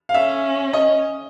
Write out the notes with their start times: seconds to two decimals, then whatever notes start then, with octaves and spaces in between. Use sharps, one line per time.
0.09 F5
0.14 C#4 E5
0.73 D#5